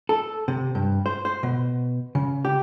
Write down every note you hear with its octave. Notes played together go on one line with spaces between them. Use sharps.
A4
C3
G2
C5
C5
B2
C#3
G4